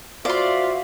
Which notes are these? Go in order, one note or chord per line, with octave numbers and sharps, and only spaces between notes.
F4 F#4 C5 D5 E5 F5 C6